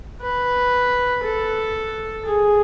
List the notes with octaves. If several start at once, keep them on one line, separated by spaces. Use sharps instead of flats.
B4
A4
G#4